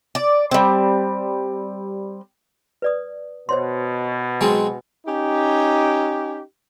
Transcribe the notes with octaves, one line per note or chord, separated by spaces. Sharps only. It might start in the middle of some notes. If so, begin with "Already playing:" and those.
D5
G3 C4
B4 D5 D#6
B2 C5 C#5 C6
F#3 G#3 C4 G#5
C#4 D#4 G4